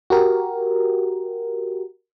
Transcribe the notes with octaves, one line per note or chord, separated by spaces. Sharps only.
F#4 G4 A#4